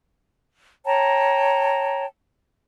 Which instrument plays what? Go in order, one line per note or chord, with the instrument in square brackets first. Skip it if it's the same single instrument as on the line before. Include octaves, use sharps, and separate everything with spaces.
[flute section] C#5 G5 A5 A#5